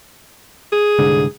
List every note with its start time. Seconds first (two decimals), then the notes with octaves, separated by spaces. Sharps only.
0.72 G#4
0.99 C2 G#2 D3